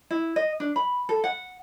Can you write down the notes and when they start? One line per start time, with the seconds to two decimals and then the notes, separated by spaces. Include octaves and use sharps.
0.11 E4
0.36 D#5
0.60 D4
0.76 B5
1.09 A4
1.24 F#5